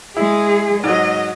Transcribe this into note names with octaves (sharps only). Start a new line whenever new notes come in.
G#3 E4 G#4
G#2 F#3 D#5